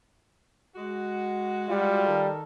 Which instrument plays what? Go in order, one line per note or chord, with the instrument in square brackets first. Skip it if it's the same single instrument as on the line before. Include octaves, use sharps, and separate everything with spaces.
[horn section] G#3 F#4
[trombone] G3 [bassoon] F4
[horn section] D#3 A4